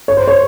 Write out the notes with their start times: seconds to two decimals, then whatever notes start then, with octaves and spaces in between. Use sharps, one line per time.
0.08 C#5
0.17 C5
0.28 C#5